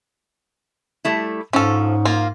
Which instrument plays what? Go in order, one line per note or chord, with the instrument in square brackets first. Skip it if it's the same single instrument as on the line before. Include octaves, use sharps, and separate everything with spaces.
[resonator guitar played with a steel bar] G3 A3 E4
[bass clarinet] G#2 [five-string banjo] F3 A4 [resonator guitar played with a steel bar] C#4
[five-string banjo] A#3 F4